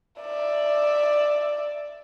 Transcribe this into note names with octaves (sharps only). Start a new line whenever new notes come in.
D5 E5